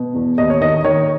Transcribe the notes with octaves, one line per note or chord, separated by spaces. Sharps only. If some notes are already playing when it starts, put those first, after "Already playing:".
Already playing: B2
E2
D#2 D#5
C#5
D#3 D#5
D#3 C#5